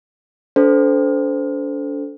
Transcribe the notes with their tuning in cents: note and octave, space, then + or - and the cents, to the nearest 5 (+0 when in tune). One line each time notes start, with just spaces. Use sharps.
D4 -40 A4 -5 C5 -20